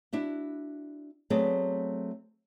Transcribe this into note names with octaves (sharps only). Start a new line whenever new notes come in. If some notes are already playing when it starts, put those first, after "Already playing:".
D4 E4 F#4
F#3 A3 B3 C4 G#4 D5